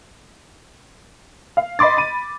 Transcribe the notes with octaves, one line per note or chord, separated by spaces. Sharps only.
F5
D#5 B5 C6 D6 A6
B5 D#7